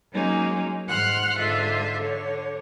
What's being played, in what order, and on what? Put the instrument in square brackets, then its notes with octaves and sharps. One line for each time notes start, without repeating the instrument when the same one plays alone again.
[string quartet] F#3 G#3 A#3 C#4 D#4
G#2 F#5 C6 F6 F#6
G#2 D3 F4 E5
D3 C#5